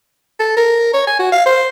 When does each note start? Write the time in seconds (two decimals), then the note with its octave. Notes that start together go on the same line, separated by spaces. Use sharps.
0.39 A4
0.57 A#4
0.93 C#5
1.07 G#5
1.19 F#4
1.32 F5
1.46 C5